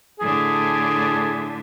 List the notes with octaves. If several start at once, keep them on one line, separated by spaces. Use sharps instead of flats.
A2 D3 G#4